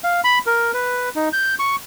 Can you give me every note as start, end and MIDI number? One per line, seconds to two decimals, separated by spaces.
0.04 0.20 77
0.24 0.39 83
0.47 0.71 70
0.74 1.09 71
1.16 1.29 63
1.33 1.55 91
1.59 1.76 85